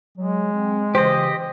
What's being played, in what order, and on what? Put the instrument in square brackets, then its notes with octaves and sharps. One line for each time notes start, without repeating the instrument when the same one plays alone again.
[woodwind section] F#3 [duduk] G#3
[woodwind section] C4
[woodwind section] C#3 E3 [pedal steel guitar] G4 D#5 [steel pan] C5